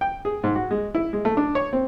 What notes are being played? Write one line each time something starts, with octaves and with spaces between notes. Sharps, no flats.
G5
G#4
G#2
F#4
G#3
E4
G#3
A3
D4
C#5
C4